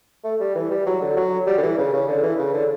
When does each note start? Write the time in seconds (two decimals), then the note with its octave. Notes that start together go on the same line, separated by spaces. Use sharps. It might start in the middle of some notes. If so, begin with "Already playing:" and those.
0.24 A3
0.40 G3
0.55 E3
0.71 G3
0.86 F#3
1.02 D3
1.17 F#3
1.46 G3
1.58 D3
1.62 E3
1.78 C#3
1.93 C#3
2.08 D3
2.23 E3
2.39 C#3
2.54 D3